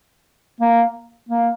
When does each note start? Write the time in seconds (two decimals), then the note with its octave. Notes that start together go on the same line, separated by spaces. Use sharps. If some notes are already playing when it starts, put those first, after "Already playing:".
0.61 A#3
1.29 A#3